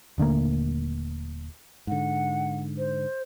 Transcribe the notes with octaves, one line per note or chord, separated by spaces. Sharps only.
D#1 D3 A3 A#3
G#2 D3 F#5
C5